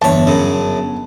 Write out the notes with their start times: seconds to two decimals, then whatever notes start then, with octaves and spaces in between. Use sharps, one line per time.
0.02 G1 E2 C#5 A5
0.27 F#2 C#3